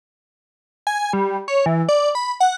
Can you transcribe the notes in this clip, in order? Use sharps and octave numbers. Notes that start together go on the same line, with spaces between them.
G#5
G3
C#5
E3
D5
B5
F#5